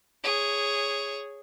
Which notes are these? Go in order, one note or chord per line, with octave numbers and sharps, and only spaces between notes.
G#4 C#5